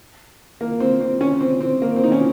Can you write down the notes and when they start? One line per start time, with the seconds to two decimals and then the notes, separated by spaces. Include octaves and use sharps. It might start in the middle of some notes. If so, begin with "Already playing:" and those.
0.61 A#3
0.80 C4
1.01 C4
1.21 C#4
1.41 C4
1.61 C4
1.82 A#3
1.96 C4
2.04 D#4
2.12 C#4